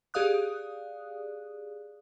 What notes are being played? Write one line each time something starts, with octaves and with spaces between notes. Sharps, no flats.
G4 G#4 D5 F5 D#6 F#6